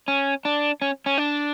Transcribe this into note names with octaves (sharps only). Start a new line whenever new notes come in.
C#4
D4
C#4
C#4
D4